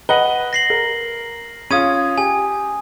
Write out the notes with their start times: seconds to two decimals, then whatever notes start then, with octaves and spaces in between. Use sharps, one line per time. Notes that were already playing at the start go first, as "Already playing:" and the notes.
0.09 B4 D#5 F#5 G7
0.53 A#6 C7 F#7
0.70 A#4
1.71 C#4 F4 D#6 G#6 D#7
2.18 G4 G#5